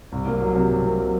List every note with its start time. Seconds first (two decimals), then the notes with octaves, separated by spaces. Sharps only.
0.12 C2
0.26 A#3
0.40 F#3
0.55 C3
0.70 C2
0.85 A#3
0.99 F#3